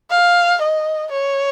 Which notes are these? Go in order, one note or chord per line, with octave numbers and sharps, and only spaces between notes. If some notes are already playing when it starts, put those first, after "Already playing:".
F5
D#5
C#5